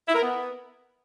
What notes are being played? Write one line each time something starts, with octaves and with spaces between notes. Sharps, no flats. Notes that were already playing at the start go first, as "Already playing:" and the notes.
E4
A#4
B3